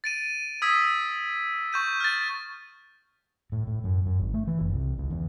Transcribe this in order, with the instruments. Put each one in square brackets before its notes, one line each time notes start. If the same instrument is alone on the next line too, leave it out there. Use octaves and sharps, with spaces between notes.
[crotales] A6 D7 D#7
D#6 E6 G#6 B6
C#6 G6 D#7
F6 A6
[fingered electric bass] A2
A2
F#2
F#2
G#1
A3
E3
F#1
C2
C#2
E2